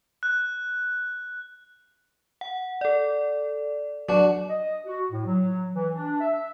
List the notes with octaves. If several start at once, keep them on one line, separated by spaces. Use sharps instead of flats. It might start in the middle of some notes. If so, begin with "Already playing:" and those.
F#6
F#5
A4 D5
F#3 D4 F#4
D#5
F#4
A2
F#3
E3
D4
E5